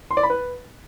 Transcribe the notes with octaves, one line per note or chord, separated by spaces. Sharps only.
C6
D5
B5
B4